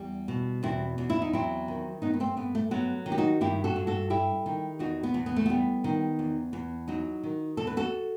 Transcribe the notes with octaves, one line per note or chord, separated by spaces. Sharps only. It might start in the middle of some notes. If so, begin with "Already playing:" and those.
Already playing: E2 G3
B2
E2 C4 E4
E2
E4
D#4
F#3 C4 E4
D#3
G2 B3 D#4
B3
A3 C4
G2 B3
A3
F#3 B3
D#3
G4
D#4 F#4
G2 E4 G4
F#4 A4
G2
F#4 A4
G3 E4 G4
D#3
E2 D#4 F#4
B3
E2
B3
A3
G3 B3
D#3
E2
E2
F#3 D#4 F#4
D#3
E2 A4
B4
F#4 A4